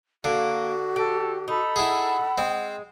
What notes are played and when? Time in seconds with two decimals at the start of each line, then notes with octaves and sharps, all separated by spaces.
0.24 D3 A#3 F#4
0.96 G4 A4
1.48 D#4 A4 B5 E6
1.76 E4 G#4 F#5
2.38 G#3 C4